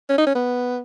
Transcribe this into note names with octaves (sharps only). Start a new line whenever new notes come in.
C#4
D#4
C#4
B3